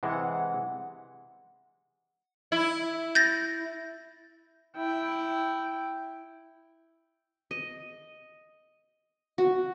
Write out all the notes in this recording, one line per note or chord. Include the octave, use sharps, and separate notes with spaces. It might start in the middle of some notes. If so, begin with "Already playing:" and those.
C3 E3 G#3 F#5
E4
G6 A6 A#6
E4 G5
D#5
F#4